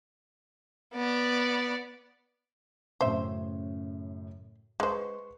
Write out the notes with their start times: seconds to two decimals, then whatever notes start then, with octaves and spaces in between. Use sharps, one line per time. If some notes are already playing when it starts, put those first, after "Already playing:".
0.94 B3 D5
3.01 F#2 A2 C#3 C5 E5
4.80 G#3 B4 C5 C6 C#6